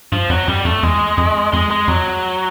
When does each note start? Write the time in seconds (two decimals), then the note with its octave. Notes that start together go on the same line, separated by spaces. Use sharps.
0.12 G2 F3
0.30 F2 F#3
0.48 F#2 G3
0.65 F2 A3
0.83 E2 G#3
1.18 F2
1.52 F2 G#3
1.71 G#3
1.88 F2 F#3